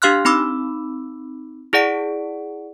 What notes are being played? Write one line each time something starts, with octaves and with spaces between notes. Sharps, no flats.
D4 G4 F5 C6 F6 F#6
C4 D#4 B5 D6 E6
E4 G#4 D5 F#5 D7